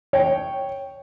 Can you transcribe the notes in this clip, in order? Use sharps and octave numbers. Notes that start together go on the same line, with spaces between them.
C#5 G5